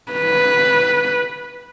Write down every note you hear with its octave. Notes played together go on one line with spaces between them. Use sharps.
B4